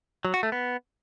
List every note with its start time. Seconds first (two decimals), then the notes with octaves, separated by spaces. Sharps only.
0.25 F#3
0.34 F#4
0.43 A3
0.52 B3